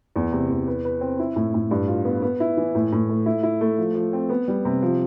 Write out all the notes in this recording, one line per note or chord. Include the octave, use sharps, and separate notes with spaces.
E2
C3
E2
B4
B4
C4
E4
A2
A2
G2
F4
B3
B3
E4
E3
A2
A2
A3
E4
E4
A3
F3
F3
C4
B3
G3
C3
F3